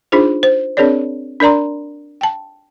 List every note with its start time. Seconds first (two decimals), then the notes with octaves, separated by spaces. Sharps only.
0.12 D4 D#4 F4 G#4 C5
0.43 C5
0.77 C4 D4 G#4 A#4 C#5 D5
1.40 D4 A#4 D5 A#5 C6
2.21 G5 A5